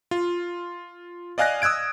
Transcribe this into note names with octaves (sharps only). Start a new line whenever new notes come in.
F4
D5 D#5 F5 G#5 F#6 A#6
D#6 E6 F#6 G#6 D7